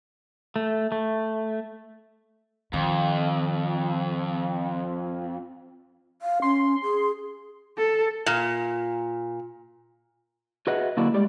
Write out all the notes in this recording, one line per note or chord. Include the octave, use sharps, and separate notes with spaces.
A3
A3
F2 D#3
F5
C#4 C6
G#4
A4
A#2
F#4 G#4 B4 D#5 E5 F#5
F#2 D3 A#3 D4 E4 F#4
G3 G#3 G4 D5